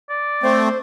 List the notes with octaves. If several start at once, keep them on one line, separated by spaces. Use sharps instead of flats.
D5
A3 C4 C5